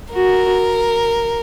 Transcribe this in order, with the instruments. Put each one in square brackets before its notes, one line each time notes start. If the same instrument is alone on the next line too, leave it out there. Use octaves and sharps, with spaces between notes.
[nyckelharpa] F#4 [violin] A#4